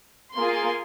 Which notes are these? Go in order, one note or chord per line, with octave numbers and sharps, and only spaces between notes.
A#3 F4 G#4 C6